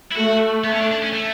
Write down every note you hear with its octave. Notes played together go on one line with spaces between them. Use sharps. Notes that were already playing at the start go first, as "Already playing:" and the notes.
E4
A3 F#4
B3
C#4
D4
D4
C#4
A3